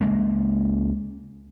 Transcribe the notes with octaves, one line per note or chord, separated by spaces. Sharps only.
C#2 G#3 A#3